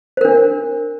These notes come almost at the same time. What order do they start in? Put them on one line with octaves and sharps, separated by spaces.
C5 A#4 D4